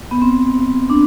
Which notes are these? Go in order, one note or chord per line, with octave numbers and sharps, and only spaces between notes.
B3
C4
D4